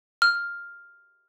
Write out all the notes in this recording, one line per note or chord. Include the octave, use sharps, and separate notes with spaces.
F6